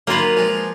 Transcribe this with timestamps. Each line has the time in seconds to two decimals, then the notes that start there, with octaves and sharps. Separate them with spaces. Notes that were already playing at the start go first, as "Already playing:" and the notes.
0.07 D#3 F#3 A#3 F4 B4
0.37 F3 G#3